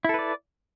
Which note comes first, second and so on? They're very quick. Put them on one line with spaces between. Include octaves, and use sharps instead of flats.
E4 A4 B4 D5